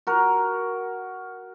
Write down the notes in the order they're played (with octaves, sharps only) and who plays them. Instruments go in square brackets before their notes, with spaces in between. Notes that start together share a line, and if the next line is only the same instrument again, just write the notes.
[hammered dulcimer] F#4 A#4